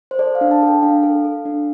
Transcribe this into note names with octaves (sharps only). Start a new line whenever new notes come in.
C5
A4 D5
F5
D4
A5
A4
G5
D4 F5
A4
A4
D4